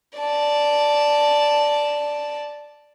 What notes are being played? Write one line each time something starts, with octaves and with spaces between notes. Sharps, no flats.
D5 A5